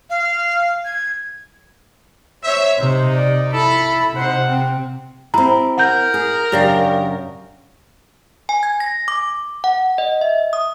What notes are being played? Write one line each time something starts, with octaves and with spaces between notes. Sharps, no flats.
F5
G#6
C5 C#5 E5
C3 D#4 C5
D5
E4 A4 B5
C3 D#4 C5 F#5
C4
C4 E4 G4 A#5 B5
A#4 F#5 G6
G#4
F#2 C#3 D4 G4 D5 F5
G#5
G#6
A#6
D6
F#5
D#5
E5
D#6